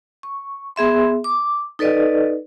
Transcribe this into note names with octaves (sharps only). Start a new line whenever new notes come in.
C#6
B3 G#4 E5 C6
D6
D#4 A4 B4 D5 D#5